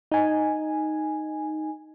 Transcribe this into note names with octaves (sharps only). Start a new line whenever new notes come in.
D#4 G#5